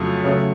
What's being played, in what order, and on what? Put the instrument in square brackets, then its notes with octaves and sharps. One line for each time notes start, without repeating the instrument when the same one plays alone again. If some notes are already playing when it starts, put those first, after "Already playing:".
Already playing: [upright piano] F2 C#3 F#3 A3
C#3 F#3 A3